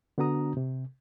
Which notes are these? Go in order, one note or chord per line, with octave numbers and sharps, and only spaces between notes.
D3 B3 D4 F#4 A#5 D#6
C3